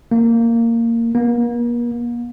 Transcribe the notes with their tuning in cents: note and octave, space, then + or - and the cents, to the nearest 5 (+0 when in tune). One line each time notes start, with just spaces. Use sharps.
A#3 -15
A#3 +40